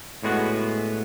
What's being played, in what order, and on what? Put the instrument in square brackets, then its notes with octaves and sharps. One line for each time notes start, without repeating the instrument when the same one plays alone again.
[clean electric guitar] A2 G#3 B3 F#4